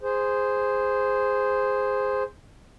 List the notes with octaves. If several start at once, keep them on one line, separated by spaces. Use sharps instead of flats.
G#4 C5